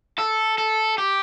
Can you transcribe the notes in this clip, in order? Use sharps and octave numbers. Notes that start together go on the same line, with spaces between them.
A4
A4
G4